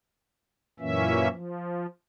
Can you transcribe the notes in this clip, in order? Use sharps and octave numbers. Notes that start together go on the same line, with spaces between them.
F#2 A#2 E3 A#3 C#4 E5
F3